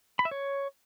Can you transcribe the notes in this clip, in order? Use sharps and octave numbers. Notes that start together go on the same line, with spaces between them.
B5
E5
C#5